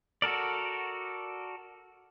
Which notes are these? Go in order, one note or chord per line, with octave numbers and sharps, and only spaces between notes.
F#4 A4 A#4 D5